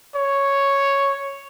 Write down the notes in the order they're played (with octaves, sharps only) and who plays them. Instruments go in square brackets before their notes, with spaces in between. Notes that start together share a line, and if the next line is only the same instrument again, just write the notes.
[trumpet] C#5